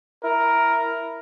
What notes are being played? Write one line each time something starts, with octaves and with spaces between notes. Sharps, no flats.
E4 A#4